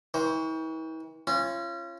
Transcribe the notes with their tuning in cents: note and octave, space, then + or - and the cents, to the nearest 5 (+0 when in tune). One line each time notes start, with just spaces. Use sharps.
E3 -45 C5 +5
C#4 -25 F4 -35